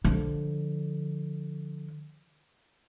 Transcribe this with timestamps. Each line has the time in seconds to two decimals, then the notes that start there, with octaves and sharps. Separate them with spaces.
0.05 D3 F3